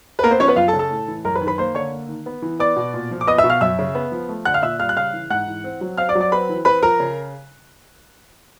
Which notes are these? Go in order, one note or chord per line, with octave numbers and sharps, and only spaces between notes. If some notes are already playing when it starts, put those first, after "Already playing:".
B4
A#3 B3 A#4
C4 C5
F3 C#4 C#5
B3 B4
F#2 F4 F5
A4 A5
C#3
A4 A5
A2
E3
F#2 A#4 A#5
B4 B5
D#3
B4 B5
A#3 C5 C6
D3 C#5 C#6
A#3
D#3
B3
E3
B3 D5 D6
B2
A#2
F3
D6
B3 D#5 D#6
E5 E6
B2
F5 F6
F#2 E5 E6
C#3
B3
F3
A3
D3 F#5 F#6
F5 F6
A#2 E5 E6
G3 F5 F6
F#6
C#3 F5 F6
E3
G#2 F#5 F#6
E3
C4
F#3
C4 F5 F6
D5 D6
F#3
D5 D6
C4 B4 B5
E3
C4 B4 B5
F3 A#4 A#5
C#3